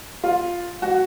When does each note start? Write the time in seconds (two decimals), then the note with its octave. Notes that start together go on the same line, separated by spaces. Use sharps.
0.23 F4
0.82 F#4